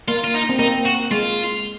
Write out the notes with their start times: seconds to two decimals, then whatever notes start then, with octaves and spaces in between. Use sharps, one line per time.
0.08 A#3 F4
0.24 F4
0.34 D#4
0.49 C4
0.59 A#3 D#4
0.86 F#4
1.11 G#3 F4